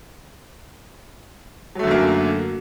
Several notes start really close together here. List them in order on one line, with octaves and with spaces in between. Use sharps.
F#3 A3 D3 F#2 A#3